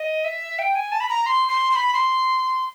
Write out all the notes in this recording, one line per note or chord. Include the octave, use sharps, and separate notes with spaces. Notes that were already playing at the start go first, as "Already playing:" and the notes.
Already playing: D#5
E5
G5
G#5
A5
B5
A#5
C6
C6
C6
B5
C6